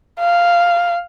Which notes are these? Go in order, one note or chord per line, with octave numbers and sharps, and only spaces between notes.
F5